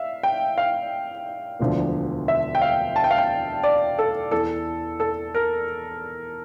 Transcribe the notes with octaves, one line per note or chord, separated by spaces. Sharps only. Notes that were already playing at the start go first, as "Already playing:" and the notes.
Already playing: E5 F5
G5
F5
E1 D2 D3 F3
E5
G5
F5
A5
G5
F5
G5
D5
A4
E2 E3 A4
A4
A#4